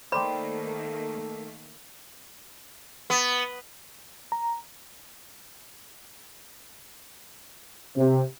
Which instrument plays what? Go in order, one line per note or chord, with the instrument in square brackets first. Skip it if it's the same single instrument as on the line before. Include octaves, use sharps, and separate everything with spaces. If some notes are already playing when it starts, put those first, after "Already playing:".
[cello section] D#3 A3 A#3 [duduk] A4 [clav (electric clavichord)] C5 D5 G5 [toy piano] B5
[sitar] B3
[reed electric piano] A#5
[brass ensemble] C3